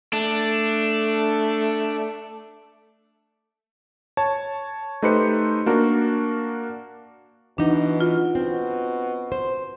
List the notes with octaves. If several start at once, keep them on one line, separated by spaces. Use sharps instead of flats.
A3 D4
C#5 A5
A3 D#4 G4 B4 C5 C#7
A#3 D4 F#4 A#4
B2 E3 D4 D#4
F4
B2 C4
C5